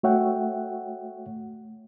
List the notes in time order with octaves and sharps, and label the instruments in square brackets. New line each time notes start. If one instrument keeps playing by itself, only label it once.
[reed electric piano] A3 F#4 C#5 E5 F#5 G5